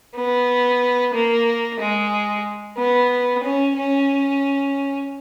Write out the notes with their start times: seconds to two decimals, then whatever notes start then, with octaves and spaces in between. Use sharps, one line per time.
0.16 B3
1.13 A#3
1.80 G#3
2.78 B3
3.43 C#4
3.76 C#4